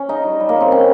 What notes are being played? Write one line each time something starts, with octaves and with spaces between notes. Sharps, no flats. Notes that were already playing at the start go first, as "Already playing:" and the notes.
Already playing: C#4
C#3 D#4
G3
G3
A#3
C#3
C4
C#3 C#4